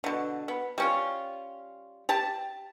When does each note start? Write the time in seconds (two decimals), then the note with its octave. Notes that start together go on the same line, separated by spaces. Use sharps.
0.04 B2 D3
0.48 B3
0.78 G3 C#4 F4
2.09 G4 A5